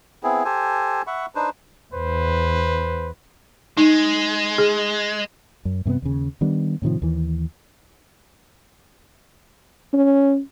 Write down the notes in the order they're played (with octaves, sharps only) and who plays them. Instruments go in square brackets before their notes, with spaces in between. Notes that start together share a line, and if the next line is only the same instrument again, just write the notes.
[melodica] B3 C4 E4 G#4
G4 A4 C5 G#5
E5 F#5 B5 C#6
D4 D#4 B4 C5
[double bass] E2 [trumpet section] B4 C5
[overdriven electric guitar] G#3 [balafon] D#4
[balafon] G#4
[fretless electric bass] F#2
G2 C3 A#3 B3
D#2 C#3
D#3 G3 B3 D4
A2 C3 D#3 F3
D#2 E3
[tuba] C#4